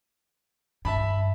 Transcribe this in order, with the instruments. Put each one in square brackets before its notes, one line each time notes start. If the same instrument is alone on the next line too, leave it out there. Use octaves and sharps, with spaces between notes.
[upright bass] G2 [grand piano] E5 A5 B5